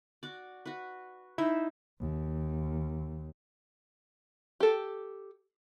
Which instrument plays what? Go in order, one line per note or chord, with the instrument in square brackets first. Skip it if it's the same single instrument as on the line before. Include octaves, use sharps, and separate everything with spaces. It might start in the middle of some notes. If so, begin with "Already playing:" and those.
[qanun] F#4 D5
F#4 B4
[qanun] D#4 C5 E5 [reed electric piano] E4
[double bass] D#2
[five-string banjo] G4 A4